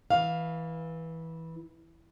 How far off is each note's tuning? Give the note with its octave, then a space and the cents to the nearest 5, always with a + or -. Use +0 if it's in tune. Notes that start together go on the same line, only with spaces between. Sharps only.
E3 -15 F5 +10